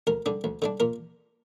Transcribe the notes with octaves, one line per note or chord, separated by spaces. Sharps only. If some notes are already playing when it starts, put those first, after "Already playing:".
D2 A#4
D3 G3 D4
D2
D3 G3 D4
A#2 A#4